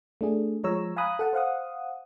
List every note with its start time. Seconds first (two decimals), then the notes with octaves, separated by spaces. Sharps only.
0.21 A3 D4 G#4
0.64 F3 G#3 C#5 A#5 E6
0.96 F5 G#5 A#5 B5 D#6 F#6
1.19 A4 F#5 A5
1.33 C5 F5 F#5 D#6